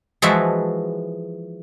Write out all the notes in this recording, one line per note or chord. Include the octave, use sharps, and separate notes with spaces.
E3 F3 G#3 F#4 E5 A5